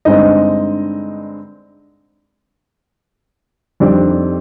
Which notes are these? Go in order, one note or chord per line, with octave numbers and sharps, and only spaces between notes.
G2 D3 G#3 C4 D#4 D#5
F2 D#3 G3 C4 D4 D5